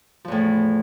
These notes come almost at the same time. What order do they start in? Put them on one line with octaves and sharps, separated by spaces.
F3 E2 A2